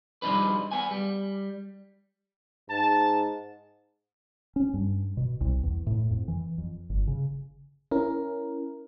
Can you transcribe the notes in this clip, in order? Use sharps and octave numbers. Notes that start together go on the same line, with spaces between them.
F3 G3 D4 D#4 B4
B3 G#5
G3
G#2 A5
C#4
G2
B2
C2
E2
A2
F2
E3
F2
G1
C#3
C#4 E4 A#4